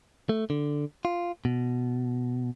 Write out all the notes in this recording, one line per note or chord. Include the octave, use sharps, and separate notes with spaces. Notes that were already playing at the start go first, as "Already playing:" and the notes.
A3
D3
F4
B2